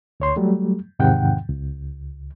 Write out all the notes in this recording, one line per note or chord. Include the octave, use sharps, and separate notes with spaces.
D2 C#5 C6
F#3 G3 A3
E2 G#2 C3 D#3 F#5 G5
C#2